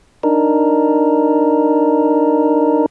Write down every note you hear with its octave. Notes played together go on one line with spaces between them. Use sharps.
D4 D#4 A#4